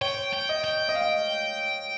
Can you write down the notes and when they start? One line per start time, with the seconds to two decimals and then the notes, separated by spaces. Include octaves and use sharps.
0.01 C#5 G5
0.33 G5
0.49 D#5
0.64 G5
0.89 D#5
0.95 F5